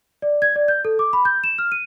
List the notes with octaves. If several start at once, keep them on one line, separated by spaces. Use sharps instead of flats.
D5
G#6
D5
G6
A4
D6
B5
G6
E7
F6
D#7